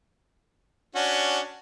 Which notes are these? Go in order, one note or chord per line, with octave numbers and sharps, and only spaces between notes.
C#4 D4 F#4